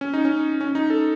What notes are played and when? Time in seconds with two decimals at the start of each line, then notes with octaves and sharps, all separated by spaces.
0.01 C#4
0.14 D#4
0.25 C#4
0.61 C#4
0.75 D#4
0.90 A4